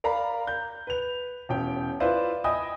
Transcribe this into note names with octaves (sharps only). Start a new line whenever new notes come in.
A#4 D5 F5 A#5 B5
G6
B4 F7
E1 C#4 G5
E4 F4 B4 C5 D5 E5
D#5 E5 G5 G#5 B5 D#6